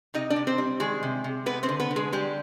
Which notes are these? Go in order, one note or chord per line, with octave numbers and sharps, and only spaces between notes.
C3 D#4 D#5
D4 D5
C3
C4 C5
G3
D#3 G#3 G#4
C3
C3
G#3 B3 B4
C4 C5
D3
B3 B4
D3
G#3 G#4
G3 G#3 G4